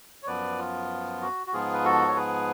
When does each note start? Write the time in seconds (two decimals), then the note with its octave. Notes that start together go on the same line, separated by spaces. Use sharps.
0.23 C#5
0.27 F#2 F3 B3 B4 D5
0.59 F4
1.21 F#4
1.47 F#4
1.53 G#2 F3 B3 F4 G#4
1.74 B4
1.84 F#4 A4
2.08 C#5
2.16 G#4 B4